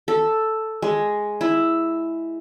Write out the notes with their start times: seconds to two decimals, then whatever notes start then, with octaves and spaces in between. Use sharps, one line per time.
0.08 A4
0.82 G#3
1.41 E4